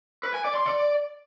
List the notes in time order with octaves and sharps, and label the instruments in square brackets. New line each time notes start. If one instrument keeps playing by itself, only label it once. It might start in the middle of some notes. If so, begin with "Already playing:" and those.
[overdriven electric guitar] B4
G#5
D5
C6
D5